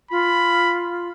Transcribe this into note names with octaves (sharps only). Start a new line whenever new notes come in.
F4 B5